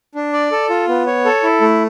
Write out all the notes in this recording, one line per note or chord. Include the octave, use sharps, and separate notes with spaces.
D4
D5
A4
F4
B3
C#5
A4
E4
A3